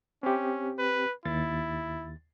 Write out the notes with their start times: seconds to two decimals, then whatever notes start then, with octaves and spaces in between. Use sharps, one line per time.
0.23 C4 C#4 G4
0.78 B4
1.25 D#2 E4 A6